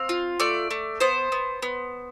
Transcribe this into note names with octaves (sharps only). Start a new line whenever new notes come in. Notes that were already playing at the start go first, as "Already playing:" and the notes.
Already playing: C4 F5
F4
A3 D5
A3
B3 C5
B3
B3